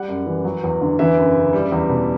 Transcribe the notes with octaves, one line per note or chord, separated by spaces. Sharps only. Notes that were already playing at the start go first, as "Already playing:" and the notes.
Already playing: G3 F#5
F#2
E3
F#3
E2
D3
E3 E5
F#2
C#3
G3
E2
B2